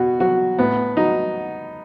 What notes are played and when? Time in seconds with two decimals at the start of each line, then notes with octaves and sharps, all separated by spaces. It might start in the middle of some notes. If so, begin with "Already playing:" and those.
Already playing: B2 F#4
0.20 F#3 F#4
0.58 A2 B3
0.97 F#3 D#4